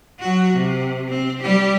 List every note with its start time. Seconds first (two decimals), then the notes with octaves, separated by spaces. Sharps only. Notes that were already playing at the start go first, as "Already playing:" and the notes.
0.20 F#3 F#4
0.54 C3
1.09 C4
1.43 G3 G4